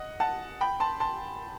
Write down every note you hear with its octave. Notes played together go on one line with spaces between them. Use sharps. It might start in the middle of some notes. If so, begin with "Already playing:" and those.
Already playing: D#5 F#5
F#5 A5
G5 B5
A5 C6
A5 C6